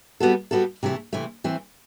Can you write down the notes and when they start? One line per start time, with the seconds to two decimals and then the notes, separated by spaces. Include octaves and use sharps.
0.20 G3 B3 F#4 A4
0.51 G3 B3 F#4 A4
0.83 C3 E3 A3
1.13 C3 E3 A3
1.44 E3 A3 C4